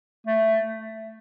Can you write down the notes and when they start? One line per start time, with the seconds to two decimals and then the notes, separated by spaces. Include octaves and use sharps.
0.26 A3